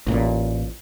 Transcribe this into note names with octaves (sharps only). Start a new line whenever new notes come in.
A1 A#2